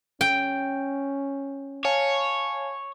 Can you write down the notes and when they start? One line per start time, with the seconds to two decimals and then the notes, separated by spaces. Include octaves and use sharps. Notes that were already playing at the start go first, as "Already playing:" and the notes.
0.21 C#4 G5
1.85 C#5 F5 G#5 A5